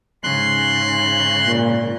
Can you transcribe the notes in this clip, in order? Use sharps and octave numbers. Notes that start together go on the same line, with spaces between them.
G#2 C#3 C6 F#6
A#2